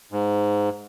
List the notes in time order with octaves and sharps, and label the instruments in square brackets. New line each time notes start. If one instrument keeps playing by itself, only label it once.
[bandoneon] G#2